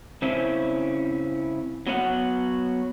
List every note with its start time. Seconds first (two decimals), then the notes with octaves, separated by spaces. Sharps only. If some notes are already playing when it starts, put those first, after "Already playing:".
0.22 C#3 C4 C#4 E4
1.87 F#3 B3 C#5 F5 F#5